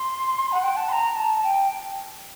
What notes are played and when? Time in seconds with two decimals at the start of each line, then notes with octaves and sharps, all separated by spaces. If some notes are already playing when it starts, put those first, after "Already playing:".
Already playing: C6
0.52 F#5
0.63 G5
0.77 A5
0.89 C6
0.92 A#5
1.16 A5
1.44 G5